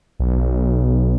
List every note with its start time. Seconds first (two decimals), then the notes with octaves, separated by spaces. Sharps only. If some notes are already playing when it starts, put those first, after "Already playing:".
0.19 B1